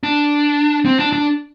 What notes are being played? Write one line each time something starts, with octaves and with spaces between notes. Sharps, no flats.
D4
C4
D4
D4